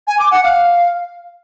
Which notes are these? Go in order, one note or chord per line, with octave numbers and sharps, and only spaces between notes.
G#5
D6
F#5
F5